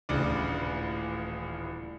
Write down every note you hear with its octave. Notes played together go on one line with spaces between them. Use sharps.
D#1 A1 C#3 D4 D6